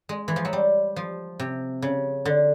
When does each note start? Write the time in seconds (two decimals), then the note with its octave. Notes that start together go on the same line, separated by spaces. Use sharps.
0.09 G#3
0.28 E3
0.36 F3
0.45 F#3
0.53 G3
0.96 F3
1.40 C3
1.82 C#3
2.25 D3